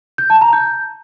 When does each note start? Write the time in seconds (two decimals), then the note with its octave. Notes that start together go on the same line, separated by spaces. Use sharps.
0.18 G6
0.30 A5
0.41 A#5
0.53 G6